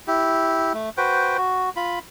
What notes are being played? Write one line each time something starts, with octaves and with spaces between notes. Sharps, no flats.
E4 G4
A3
F#4 B4 C5 G5
F#4
F4 B5